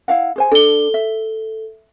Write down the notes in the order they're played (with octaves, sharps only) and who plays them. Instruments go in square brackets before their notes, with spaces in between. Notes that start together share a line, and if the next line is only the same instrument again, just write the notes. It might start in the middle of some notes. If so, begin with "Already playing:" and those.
[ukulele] E4 F5 F#5
G#4 C5 G#5
[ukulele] D4 [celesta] A4 G7
[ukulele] E5